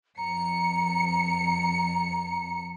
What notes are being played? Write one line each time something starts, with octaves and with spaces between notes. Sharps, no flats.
F2 A#5 C#7